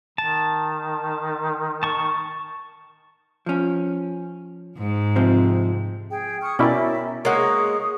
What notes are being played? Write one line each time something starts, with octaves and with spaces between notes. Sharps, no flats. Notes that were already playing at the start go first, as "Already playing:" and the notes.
D#3 A5
A5 C#6
F3 C#4
G#2
C3 F3 C4
G#4 G5
C#6 D#6 F6
B2 C#4 E4 A#4 D5 E5 G5
G#3 A#3 A#4 C#5 F#5 C#6 D#6